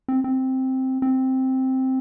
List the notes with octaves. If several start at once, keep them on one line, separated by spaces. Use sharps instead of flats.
C4
C4
C4